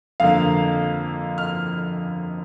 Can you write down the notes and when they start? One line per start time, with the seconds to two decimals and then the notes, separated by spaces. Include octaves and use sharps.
0.20 F2 D3 A#3 F5
1.38 F6